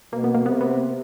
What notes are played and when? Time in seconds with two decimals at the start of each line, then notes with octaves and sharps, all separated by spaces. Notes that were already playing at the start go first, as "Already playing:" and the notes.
0.13 B2 A#3
0.24 B3
0.34 A#3
0.46 C3 B3
0.52 A#3
0.61 B3